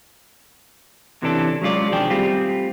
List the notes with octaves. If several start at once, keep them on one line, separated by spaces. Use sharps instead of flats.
C3 E3 C#4 D4 G#4 A4
F#3 G#3 C#4 F4 D5
B1 D#3 F3 D4 G#4 G5
G3 A3 C4 F4 G4 G#4